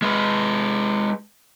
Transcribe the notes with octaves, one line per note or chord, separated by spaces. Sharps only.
G#3 B4